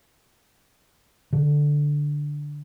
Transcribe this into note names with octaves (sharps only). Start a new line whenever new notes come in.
D3